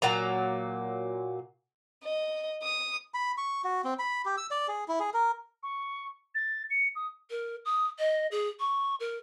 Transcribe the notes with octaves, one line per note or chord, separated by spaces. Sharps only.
A#2 F#3 A#3 A#5
D#5
D#6
B5
C#6
F#4
C4
B5
G4
E6
D5
G#4
E4
G#4
A#4
C#6
A6
C#7
D#6
A#4
D#6
D#5
G#4
C#6
A#4